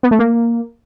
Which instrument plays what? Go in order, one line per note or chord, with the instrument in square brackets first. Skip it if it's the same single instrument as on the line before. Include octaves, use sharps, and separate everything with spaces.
[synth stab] B3
A3
A#3